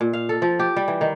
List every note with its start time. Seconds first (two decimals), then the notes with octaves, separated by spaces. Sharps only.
0.01 A#2
0.13 F5
0.29 A4
0.42 F3
0.59 G4
0.77 G3
0.88 E3
1.01 D#3